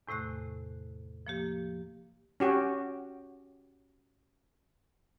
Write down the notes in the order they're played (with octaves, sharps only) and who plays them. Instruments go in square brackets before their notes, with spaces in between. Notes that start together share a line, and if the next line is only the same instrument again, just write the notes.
[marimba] E2 A2 C3 A3 F#6
F3 A#3 G4
[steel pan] C#4 F#4 G4